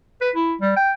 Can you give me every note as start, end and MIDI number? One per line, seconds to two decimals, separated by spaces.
0.21 0.30 71
0.35 0.53 64
0.61 0.72 55
0.76 0.92 79